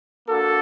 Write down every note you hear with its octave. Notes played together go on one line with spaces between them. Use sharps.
A#3 D4 F#4 A4